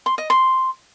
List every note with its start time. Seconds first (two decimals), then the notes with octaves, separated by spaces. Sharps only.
0.06 C6
0.18 D#5
0.30 C6